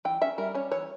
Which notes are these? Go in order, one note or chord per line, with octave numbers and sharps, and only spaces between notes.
E3 G5
C#4 E5
G3 A#4
C#4 C#5
E3 C#5